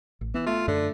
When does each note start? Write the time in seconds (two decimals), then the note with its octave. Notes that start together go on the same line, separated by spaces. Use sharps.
0.21 A1
0.34 E3 B3
0.46 A3 F4
0.68 F#2 D3